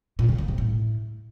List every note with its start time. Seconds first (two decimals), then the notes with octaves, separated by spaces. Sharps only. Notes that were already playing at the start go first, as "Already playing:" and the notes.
0.19 A#2
0.29 C#3
0.38 D#3
0.48 C3
0.58 A2